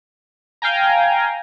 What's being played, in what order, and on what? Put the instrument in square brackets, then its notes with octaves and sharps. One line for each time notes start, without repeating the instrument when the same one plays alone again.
[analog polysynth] F5 G5 G#5 A#5